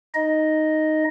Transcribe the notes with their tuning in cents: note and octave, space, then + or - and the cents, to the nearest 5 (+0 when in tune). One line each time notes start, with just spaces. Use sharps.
D#4 +0 D#5 +0